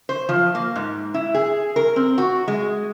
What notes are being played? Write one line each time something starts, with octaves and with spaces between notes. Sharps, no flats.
C5
F3
A#3
G#2
E4
G#4
A#4
C4
F#4
G#3